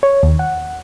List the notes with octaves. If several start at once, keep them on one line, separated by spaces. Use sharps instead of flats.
C#5
D#2
F#5